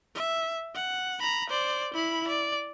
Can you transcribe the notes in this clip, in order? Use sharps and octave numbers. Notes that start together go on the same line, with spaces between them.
E5
F#5
A#5 B5
C5 D5
E4 B5
D5